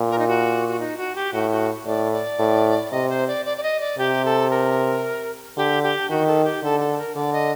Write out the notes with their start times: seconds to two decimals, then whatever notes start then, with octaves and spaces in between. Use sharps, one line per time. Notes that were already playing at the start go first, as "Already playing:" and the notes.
Already playing: A#2
0.10 A#4
0.19 D#4
0.28 F#4
0.69 F#4
0.80 D#4
0.97 F#4
1.15 G4
1.33 A2 F#4
1.51 F#4
1.86 A2 D5
2.12 D5
2.39 A2
2.92 C3 D#5
3.09 C5
3.27 D5
3.45 D5
3.57 D5
3.63 D#5
3.80 D5
3.98 C3 G4
4.25 A4
4.50 A#4
5.57 D3 G4
5.83 G4
6.10 D#3 F#4
6.27 A4
6.45 G4
6.62 D3 A4
6.80 A4
6.98 A#4
7.15 D3 D5
7.33 D#5